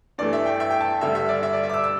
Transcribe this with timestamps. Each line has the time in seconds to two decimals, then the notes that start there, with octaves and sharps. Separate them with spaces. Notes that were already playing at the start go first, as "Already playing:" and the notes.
0.18 G2 E3 A3 D5
0.33 E5
0.46 G5
0.60 E5
0.70 G5
0.81 A5
1.01 G2 D3 G3 E5
1.15 E5
1.29 D5
1.43 E5
1.53 D5
1.63 E5
1.69 D6
1.74 E6
1.84 E6